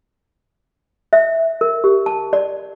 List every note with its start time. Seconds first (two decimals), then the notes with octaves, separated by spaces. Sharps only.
1.13 E5
1.61 A#4
1.84 G4
2.06 A5
2.33 D5